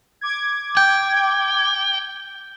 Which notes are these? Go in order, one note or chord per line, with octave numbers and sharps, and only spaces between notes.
D6 G#6
G5 G6